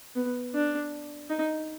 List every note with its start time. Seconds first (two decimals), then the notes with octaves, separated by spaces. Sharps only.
0.16 B3
0.54 D4
1.30 D#4